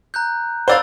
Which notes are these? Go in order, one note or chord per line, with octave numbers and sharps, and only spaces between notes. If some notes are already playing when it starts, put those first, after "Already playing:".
A#5 F#6 G6
C5 D5 F5 B5 E6 A6